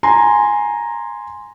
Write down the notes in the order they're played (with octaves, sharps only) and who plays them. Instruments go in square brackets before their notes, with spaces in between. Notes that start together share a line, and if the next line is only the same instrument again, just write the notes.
[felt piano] G#5 A#5 C6